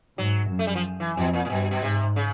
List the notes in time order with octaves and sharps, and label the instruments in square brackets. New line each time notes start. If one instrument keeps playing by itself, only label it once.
[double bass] G#2 [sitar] F#3
[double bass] F#2
[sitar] A3
G3
F3
E3
[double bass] F2 [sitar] B2
[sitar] A#2
A#2
[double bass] G2 [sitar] B2
[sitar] B2
[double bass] G#2 [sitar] C3
[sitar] C#3